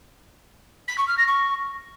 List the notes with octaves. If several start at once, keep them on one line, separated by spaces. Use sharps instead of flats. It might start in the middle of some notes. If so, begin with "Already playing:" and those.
B6
C#6
F6
A#6
C#6